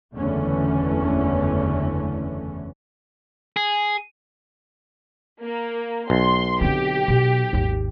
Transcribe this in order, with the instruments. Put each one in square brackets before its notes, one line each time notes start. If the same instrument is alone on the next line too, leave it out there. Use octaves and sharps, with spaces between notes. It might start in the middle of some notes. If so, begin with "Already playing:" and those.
[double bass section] F#1 E2 D3 E3 A3 C#4
[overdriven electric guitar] G#4
[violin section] A#3
[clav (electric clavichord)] B1 [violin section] C6
[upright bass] D3 C4 [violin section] G4
[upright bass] B2
G#1 D#2